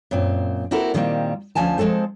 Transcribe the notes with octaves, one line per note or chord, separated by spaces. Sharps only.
F#2 A#2 C4
A#3 C4 E4 F#4 A4 A#4
A#2 D3 D#3 G3 A#3 C4
D2 F3 C#4 G#5 A5
F3 G#3 C4 A4 C5